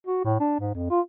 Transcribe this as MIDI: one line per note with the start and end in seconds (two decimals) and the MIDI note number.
0.07 0.23 66
0.24 0.38 45
0.40 0.55 62
0.59 0.71 44
0.75 0.89 41
0.90 1.01 65